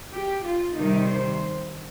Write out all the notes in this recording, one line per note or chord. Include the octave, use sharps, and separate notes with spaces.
G4
F4
C3 D#3 G3 D#4
C5